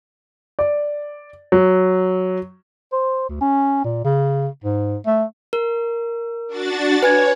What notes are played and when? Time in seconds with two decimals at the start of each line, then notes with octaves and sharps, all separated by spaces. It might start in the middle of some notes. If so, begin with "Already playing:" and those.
0.59 D5
1.52 F#3
2.93 C5
3.29 D2
3.41 C#4
3.84 A#2
4.04 C#3
4.64 G#2
5.06 A3
5.53 A#4
6.47 D4 F#4 A6
7.03 B4 C#5 G#5 G#6